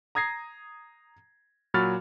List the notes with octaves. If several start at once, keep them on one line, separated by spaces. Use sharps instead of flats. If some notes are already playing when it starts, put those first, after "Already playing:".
A#5 D#6 G#6 A#6 C7
A#2 F#3 F#4 B5 F6 A6